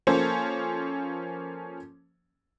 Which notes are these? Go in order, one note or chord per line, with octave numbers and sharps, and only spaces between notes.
F3 A#3 C#4 A4 C5